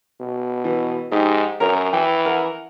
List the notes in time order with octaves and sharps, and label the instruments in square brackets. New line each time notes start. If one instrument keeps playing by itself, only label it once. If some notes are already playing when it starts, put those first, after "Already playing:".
[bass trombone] B2
[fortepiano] E3
[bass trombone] G#2 [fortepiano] D#4 G4
[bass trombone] F#2 [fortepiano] A#4 C#5 A#5
[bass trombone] E3 [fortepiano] G5
[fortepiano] A#4 F#5